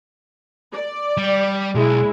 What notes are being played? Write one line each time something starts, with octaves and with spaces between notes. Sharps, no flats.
D5
G3
B1 G#3 E4